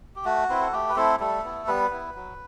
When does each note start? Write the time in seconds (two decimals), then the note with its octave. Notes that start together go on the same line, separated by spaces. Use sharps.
0.16 G4
0.25 A3 F#4
0.49 C4 E4 B4
0.61 A4
0.73 A3 G4
0.89 B4
0.96 A3 C4 E4 A4
1.20 G3 A3 A4
1.44 B3 E4
1.67 G3 B3 B4
1.91 B3 E4
2.15 F#3